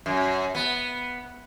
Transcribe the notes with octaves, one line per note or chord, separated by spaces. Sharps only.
F#2
B3